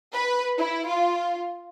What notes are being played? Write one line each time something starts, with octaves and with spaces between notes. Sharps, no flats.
B4
E4
F4